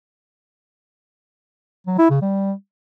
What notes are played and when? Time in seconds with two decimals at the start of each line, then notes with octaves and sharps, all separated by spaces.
1.87 F#3
1.99 E4
2.10 C#3
2.22 G3